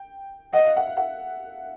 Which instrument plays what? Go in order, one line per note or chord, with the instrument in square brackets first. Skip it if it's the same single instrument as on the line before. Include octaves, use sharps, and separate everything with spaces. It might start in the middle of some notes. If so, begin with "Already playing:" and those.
Already playing: [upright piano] G5
[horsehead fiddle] D#5 [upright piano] F#5
[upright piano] F5
E5 F#5
F5
E5 F#5